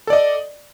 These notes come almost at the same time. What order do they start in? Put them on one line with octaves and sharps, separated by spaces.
A4 D5 D#5